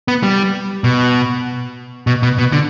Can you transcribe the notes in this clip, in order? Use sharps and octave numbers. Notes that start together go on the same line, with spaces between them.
B3
G3
B2
B2
B2
B2
D3